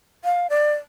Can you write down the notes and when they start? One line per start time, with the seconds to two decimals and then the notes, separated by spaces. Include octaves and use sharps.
0.24 F5
0.50 D5